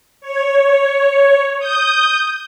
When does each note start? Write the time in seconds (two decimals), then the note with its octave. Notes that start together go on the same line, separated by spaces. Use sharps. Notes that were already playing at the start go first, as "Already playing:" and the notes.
0.21 C#5
1.59 D#6 G6